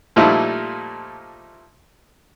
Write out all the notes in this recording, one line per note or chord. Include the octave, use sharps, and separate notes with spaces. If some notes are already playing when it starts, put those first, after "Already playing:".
A#2 F3 G3 A3 D#4 E4